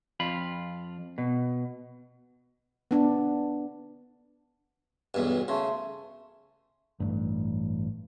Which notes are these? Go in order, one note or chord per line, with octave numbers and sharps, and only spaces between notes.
F2 F4 B5
B2
B3 D4
B1 E2 G2
C#3 A3 C6
A1 G2